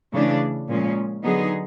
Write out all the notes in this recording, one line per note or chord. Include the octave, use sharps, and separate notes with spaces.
C#3 E3 A3 D4
A#2 F3 G#3 C#4
D3 F#3 B3 D#4 G#4